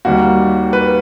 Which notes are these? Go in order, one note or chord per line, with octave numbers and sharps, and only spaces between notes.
D#2 D#3 G3 A#3 F#4
B4